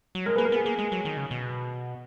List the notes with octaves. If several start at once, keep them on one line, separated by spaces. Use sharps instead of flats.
F#3
G#3 A#4
A#3 G#4 B4
A#4
B3 G#4
A#3 G#4
G#3
F#3
D#3
C#3
B2